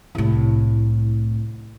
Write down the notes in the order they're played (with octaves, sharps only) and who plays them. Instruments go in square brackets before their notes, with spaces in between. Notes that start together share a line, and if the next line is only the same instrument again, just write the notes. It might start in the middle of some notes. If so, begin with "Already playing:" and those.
[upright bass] C2 A2